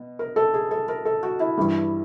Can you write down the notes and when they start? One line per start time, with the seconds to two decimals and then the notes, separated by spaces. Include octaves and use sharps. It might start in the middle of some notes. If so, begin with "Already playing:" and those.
Already playing: B2
0.19 A#4
0.36 A4
0.54 G#4
0.71 A4
0.88 A#4
1.05 A4
1.23 F#4
1.40 E4
1.57 G2 E3 G3